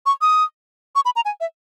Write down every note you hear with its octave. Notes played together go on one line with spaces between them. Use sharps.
C#6
D#6
C#6
B5
A#5
G#5
E5